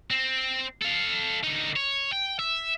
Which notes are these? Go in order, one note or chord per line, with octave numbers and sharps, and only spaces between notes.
C4
A4 F5
D3 D#4
C#5
G5
E5